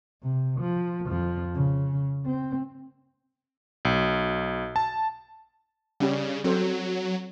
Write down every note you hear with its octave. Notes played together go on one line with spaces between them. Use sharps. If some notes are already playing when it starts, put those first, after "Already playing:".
C3
F3
F2 F3
C#3
C4
B1
A5
C#3 G3 C#4 G4
F#3 C4 A4 C5